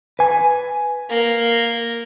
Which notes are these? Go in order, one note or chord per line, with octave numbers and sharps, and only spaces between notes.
B4 G#5
A#3